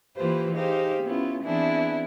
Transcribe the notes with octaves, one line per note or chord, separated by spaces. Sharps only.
E3 A#3 F4 G4 B4 C5
D#4 G4 G#4 C5 F5
B3 C#4 E4 F4
E3 B3 C4 D4 E4 G#4